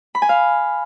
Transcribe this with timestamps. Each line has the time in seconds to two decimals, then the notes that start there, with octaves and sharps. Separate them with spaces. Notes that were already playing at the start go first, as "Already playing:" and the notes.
0.15 B5
0.22 G#5
0.29 F5